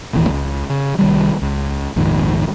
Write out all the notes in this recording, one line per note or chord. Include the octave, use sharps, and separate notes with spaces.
E1 A1 D#2 E3
C#2
C#3
C2 D#3 G3
C#2
A#1 F2 G#2 D#3